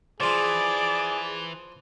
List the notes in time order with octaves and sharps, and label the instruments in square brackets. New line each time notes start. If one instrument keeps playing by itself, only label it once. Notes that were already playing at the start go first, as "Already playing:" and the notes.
[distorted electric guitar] E3 [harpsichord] F3 F4 [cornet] G#4 [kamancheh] D5